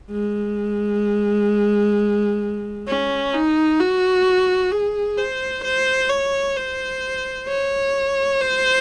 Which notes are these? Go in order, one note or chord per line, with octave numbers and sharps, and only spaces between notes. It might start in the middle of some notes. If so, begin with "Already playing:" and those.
G#3
C#4
D#4
F#4
G#4
C5
C5
C#5
C5
C#5
C5